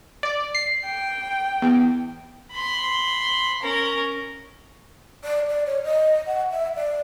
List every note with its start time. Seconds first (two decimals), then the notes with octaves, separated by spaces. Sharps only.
0.23 D5
0.55 C7
0.86 G5
1.62 E2
2.51 B5 C6
3.62 C#4 A#4
5.24 D5
5.49 D5
5.67 C#5
5.84 D#5
6.27 F#5
6.51 E5
6.77 D5